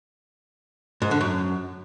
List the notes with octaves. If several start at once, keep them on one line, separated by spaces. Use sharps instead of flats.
G#2
D3
F#2